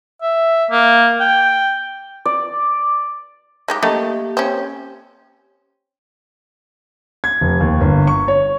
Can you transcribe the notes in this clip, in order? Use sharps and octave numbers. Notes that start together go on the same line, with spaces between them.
E5
A#3
G5
D5
G#3 D#4 G4
A3 A#3 G4 D#5
C4 C#4
G#6
F1
D#2
G1
C#6
C#5